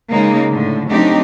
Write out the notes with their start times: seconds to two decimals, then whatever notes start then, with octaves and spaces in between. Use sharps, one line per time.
0.11 C#3 G#3 A#3 D#4
0.51 A2 D3
0.89 F#3 A3 C4 D4 D#4 G4